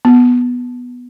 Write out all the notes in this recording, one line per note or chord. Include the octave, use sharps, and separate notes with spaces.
B3